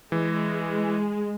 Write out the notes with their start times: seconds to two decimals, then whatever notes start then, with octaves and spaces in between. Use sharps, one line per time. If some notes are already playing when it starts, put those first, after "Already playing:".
0.12 E3 G#3